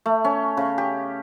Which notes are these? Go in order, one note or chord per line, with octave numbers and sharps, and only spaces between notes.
A3
C#4
C#3
G4